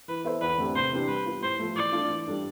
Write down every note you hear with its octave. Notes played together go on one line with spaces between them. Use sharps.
E3 B4
B3 E4 A4 C5
E2 B4
D3 A3 C4 G4
C3 C5
E3 B3 D4 G4
G3 B4
B3 F4
A2 C5
F3 A3
E3 D5
A3 D4 F4
E3
G3 D4 A4